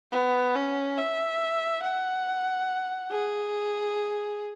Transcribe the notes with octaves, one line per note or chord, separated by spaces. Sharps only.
B3
C#4
E5
F#5
G#4